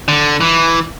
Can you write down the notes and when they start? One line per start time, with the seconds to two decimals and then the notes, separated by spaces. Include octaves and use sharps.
0.08 D3
0.41 E3